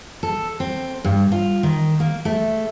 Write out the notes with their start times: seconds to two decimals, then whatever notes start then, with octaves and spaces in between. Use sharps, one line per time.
0.23 A4
0.60 C4
1.04 G2
1.32 F4
1.63 D#3
2.00 A#3
2.25 A3